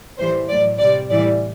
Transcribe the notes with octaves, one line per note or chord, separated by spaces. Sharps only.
A2 E3 G3 C5
A2 F#3 D5
C3 G3 D5
A2 E3 G3 D5